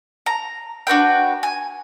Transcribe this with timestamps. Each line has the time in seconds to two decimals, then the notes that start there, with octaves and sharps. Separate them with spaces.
0.26 A#5
0.87 D4 F#4 B4 G5
1.43 G#5